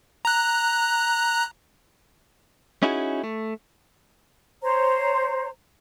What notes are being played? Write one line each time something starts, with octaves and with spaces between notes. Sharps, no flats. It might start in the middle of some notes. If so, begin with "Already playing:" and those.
A#5 F#6
C#4 D#4 E4 F#4 G#4
A3
C5 C#5 A#5